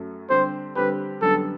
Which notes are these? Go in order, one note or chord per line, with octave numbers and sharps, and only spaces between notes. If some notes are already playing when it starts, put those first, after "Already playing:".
Already playing: F#2 F#3 A3
D3 G3 C4 G4 C5
D3 G3 C4 G4 B4
F#2 D3 G3 B3 A4